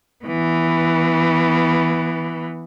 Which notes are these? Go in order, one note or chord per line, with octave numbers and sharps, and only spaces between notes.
E3 B3